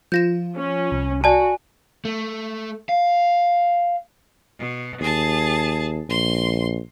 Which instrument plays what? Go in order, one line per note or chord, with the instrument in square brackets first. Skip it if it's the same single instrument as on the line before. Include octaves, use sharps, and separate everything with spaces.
[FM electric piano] F3 F4 [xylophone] G6 A#6 E7
[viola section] C#4
[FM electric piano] C2
[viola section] F#4 [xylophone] D5 A5 [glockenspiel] G#5
[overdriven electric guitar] A3
F5
[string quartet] B2
[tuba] D#2 [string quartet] G#4 A5
[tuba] A#1 [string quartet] C6